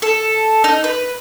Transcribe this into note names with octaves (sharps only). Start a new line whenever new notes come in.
A4
D#4
B4